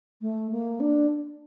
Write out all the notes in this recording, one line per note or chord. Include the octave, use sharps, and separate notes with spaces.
A3
A#3
D4